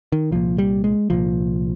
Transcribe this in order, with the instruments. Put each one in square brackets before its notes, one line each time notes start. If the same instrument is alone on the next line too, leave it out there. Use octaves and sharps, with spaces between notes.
[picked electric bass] D#3
C2 A#2 F3
G3
G#3
C2 A#2 F3